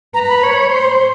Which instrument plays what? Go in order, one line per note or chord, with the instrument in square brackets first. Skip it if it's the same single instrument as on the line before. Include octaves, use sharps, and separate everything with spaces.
[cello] B4 [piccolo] A#5
[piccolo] A#5
B5
[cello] C#5
C5